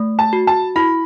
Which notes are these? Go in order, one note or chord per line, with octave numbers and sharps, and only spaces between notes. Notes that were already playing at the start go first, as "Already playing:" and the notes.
Already playing: A3
A5
F#4
A5
E4 B5